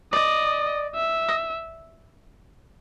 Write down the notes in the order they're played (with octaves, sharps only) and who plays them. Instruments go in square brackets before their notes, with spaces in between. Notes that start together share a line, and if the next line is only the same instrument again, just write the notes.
[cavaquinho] D5 [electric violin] D#5
[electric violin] E5
[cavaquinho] D#5